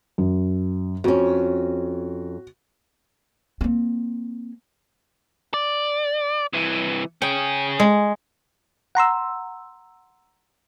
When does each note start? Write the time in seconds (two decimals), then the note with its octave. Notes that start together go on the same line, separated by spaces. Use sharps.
0.18 F#2
1.04 F2 C#4 F#4
3.61 A#3 C4
5.54 D5
6.53 C2 E3
7.22 C#4 G#4 G5
7.80 G#3
8.95 F#5 A#5 C6 E6